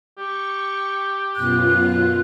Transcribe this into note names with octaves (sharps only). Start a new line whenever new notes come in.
G4 C#6
F#2 B2 F4 F#6